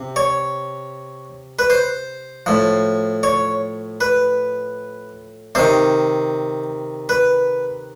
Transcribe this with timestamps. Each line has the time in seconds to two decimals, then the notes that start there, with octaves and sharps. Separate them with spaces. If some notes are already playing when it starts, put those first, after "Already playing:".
Already playing: C3
0.16 C#5
1.59 B4
1.70 C5
2.46 A2 F3
3.23 C#5
4.01 B4
5.55 C3 D#3 C5
7.09 B4